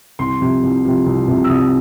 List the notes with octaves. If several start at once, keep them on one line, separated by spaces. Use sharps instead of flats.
C2 C6
C3 F3
C2
C3 F3
C2
C3 F3
E6
C2 D#6